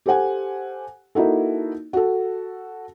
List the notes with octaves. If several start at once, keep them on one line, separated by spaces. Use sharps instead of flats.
G4 A4 C5 F#5 G#5
A#3 D#4 E4 F#4 A4
F#4 A4